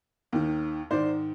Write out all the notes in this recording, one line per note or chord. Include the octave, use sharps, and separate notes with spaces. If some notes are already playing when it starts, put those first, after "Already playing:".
D#2 D#3
G#2 D#3 C5 D5